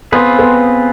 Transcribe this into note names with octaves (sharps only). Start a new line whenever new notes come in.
B3 C4 F4 G#4 B4
B3